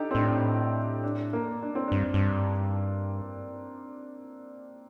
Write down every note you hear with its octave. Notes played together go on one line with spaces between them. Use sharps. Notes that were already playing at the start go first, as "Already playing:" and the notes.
Already playing: D4 D#4 G4 A4
C4
A2 D4
D4
A#3
D4
C4
G2 D4
G2